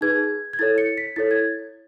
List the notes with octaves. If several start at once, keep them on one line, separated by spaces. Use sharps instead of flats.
D#4 G#4 B4 G#6
G#6
E4 A4 C#5 A6
C#7
B6
E4 A4 C#5 A6
G#6